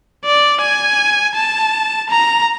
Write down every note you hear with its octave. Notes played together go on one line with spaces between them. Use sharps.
D5
G#5
A5
A#5